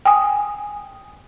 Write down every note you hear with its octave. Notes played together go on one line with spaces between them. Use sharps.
G5 G#5 D#6